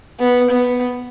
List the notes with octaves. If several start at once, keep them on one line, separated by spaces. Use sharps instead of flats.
B3
B3